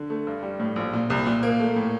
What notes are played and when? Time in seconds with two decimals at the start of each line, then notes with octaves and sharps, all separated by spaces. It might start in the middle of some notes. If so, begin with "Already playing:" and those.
Already playing: D3
0.10 A3
0.27 G2
0.42 G3
0.59 A2
0.76 A#1
0.93 A#2
1.10 C2
1.26 A#2
1.43 A#3
1.60 A3
1.76 A2